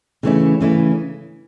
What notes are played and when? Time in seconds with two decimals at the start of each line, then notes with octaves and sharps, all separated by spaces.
0.23 C#3 E3 A3 C#4 E4
0.61 C#3 E3 A3 C#4 E4